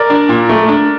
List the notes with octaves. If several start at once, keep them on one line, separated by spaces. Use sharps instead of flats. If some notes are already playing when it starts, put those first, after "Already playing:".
Already playing: A#4 D5
D4
A#2
A3
D4